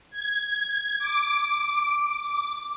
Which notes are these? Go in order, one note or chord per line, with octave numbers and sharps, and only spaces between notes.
G#6
D6
D6